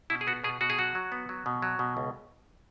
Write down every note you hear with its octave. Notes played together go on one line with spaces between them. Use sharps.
B2 E4
G#4
B3 F#4
B2 G#4
B2 F#4
G#4
F#3 F#4
F#3
B3
F#3
B2
F#3
B2
C#2